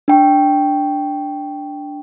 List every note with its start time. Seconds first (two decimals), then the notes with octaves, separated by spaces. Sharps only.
0.08 D4 G5 C#6